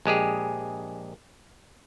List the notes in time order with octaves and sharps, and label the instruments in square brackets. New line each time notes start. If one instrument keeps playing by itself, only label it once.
[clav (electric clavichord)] A#1 G#3 G4 G#4